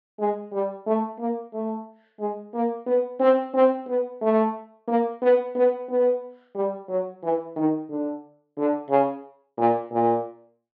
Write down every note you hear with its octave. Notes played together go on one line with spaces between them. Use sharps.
G#3
G3
A3
A#3
A3
G#3
A#3
B3
C4
C4
B3
A3
A#3
B3
B3
B3
G3
F#3
E3
D#3
D3
D3
C#3
A#2
A#2